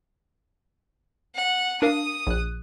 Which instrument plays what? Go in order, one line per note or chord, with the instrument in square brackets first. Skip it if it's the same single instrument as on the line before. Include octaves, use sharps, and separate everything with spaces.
[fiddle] F#5
[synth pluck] D4 A#4 F5 [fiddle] D#6
[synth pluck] A#1 F#6